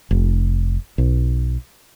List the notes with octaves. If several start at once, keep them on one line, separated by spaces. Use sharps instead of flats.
F1
B1